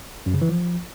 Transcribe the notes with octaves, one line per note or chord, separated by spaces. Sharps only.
F#2
C#3
E3
F3